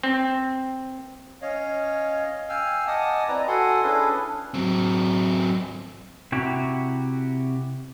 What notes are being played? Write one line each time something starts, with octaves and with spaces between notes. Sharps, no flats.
C4
C#4 C#5 D#5 F5
F5 G5 G#5 E6 F6
D#5 F#5 G#5 A5 D6 D#6
C4 E4 B4 D5 D#5 A#5
F#4 A4 F#5 G#5 C6
C#4 D4 E4 G#4 A4 B4
F#3 C4
C3 E4 F#4 G4